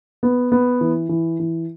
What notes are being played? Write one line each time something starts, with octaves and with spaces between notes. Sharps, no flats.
B3
B3
E3
E3
E3